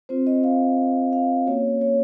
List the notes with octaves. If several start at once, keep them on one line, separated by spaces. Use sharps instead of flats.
C4 F4 C5
D#5
F5
F5
A#3 C#4 F#4 C#5
C#5